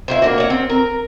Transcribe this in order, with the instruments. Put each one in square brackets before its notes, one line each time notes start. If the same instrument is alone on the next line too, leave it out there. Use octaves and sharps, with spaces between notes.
[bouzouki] E4 G4 C5
A#3 D4 F#4
C#5 F#5
C4
A#4